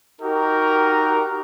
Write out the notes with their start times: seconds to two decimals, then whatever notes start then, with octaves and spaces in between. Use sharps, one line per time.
0.21 D#4 F#4 G4 A#4